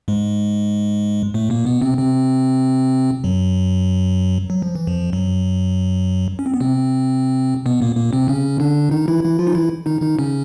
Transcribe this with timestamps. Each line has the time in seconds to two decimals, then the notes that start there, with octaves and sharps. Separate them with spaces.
0.08 G#2 G#3
1.34 A2 A3
1.50 A#2 A#3
1.66 B2 B3
1.82 C3 C4
1.98 C3 C4
3.24 F#2 F#3
4.50 F#3
4.62 F3
4.75 E3
4.87 F2 F3
5.13 F#2 F#3
6.39 C#4
6.46 C4
6.54 B3
6.60 C3 C4
7.66 B2 B3
7.82 A#2 A#3
7.97 A#2 A#3
8.13 C3 C4
8.28 C#3 C#4
8.60 D3 D4
8.91 D#3 D#4
9.08 E3 E4
9.23 E3 E4
9.39 F3 F4
9.47 D#4
9.54 E3 E4
9.86 D#3 D#4
10.02 D#3 D#4
10.19 C#3 C#4